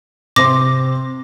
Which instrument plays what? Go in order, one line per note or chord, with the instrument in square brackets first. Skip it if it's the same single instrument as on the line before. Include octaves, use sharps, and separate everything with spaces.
[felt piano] C3 C5 C6 [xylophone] D6 A#6